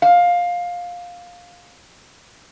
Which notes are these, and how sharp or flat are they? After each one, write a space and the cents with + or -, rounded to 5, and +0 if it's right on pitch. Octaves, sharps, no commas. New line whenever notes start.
F5 +15